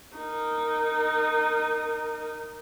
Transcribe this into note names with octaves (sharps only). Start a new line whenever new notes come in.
D#4 A#4